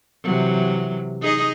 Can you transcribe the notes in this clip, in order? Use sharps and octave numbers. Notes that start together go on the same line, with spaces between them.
C3 E3 F#3
D#4 G#4 D#5